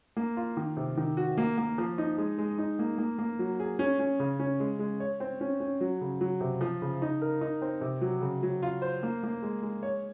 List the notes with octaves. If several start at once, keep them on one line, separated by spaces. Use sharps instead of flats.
A#3
F4
D#3
C3
D#3
F#4
A#3
A#3
F3
D#4
G#3
G#3
D#4
A#3
A#3
A#3
F#3
G#4
C#4
C#4
C#3
C#4
G#3
G#3
C#5
C4
C#4
C#4
F#3
C#3
F#3
C3
F3
C#3
D#4
A#4
D#4
C4
C3
F#3
C#3
F#3
F4
C5
A#3
A#3
G#3
G#3
C#5